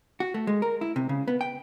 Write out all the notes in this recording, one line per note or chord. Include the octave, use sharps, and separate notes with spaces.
F#4
A3
G#3
A#4
E4
C3
C#3
B3
G5